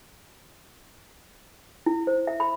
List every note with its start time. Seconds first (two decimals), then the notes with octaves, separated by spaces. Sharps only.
1.86 E4
2.07 C5
2.27 E5
2.40 B5